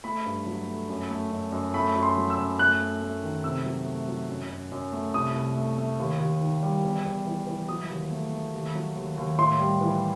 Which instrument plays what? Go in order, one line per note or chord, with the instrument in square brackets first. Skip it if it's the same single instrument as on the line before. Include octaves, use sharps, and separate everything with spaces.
[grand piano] A3 B5
G2
F#3
A3
F#2
A3
F#2
F#2
A3 B5
F#2
C6
F#3
E6
F#2
A3 F#6
A3
A3
D#3
C3 E6
F#3
A3
F#3
F#2
F#2
F#2
A3
C2 D#6
C2
A3
A3
D#2
D#2
D#3
G3
E2
E2
E3
E3
F#3 D#6
D#2
A3
A3
D#2
F#3
D#2
D#2
A2 C6
G3
E3